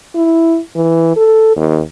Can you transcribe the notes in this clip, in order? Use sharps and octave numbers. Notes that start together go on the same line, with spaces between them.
E4
E3
A4
D#2